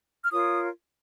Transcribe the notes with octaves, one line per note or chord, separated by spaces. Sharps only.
F6
F4 A#4 C#5 D#6